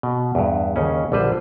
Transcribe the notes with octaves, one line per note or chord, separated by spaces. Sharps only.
B2
E2 G2
D#2 C#3 C#4
A#1 D3 G3 B4 C5